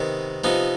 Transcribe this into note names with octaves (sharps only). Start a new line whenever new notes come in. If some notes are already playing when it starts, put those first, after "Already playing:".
Already playing: C3 D#3 B3
C3 F3 B3 D#4